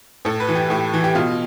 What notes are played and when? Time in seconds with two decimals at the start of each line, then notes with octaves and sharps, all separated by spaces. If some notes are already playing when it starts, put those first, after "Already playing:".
0.25 A2 A4
0.40 B4
0.49 E3
0.55 G4
0.70 A2 G4
0.94 E3
1.04 G4
1.15 B2 F4